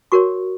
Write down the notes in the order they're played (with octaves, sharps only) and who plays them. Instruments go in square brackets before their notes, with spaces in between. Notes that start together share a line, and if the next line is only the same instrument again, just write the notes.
[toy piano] F#4 A#4 C#5 C#6